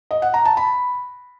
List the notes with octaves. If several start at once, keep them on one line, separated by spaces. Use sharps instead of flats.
D#5
F#5
A#5
A5
B5